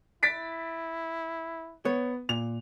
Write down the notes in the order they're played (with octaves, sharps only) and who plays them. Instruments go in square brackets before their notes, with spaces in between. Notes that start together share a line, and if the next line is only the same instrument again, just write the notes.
[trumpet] E4 [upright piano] A6 B6 D7
[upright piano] B3 [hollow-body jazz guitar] C#5
[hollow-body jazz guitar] A#2 [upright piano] F7